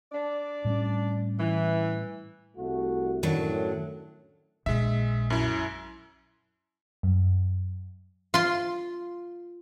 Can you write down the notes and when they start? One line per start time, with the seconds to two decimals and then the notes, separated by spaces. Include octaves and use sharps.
0.12 D4 D5
0.65 A2 G3 C#4
1.39 E3
2.56 C2 A3 F#4
3.23 F#2 A2 D#3 F#3 D4
4.66 A#1 G#3 E5
5.30 F#2 E4
7.03 F#2
8.34 F4 C6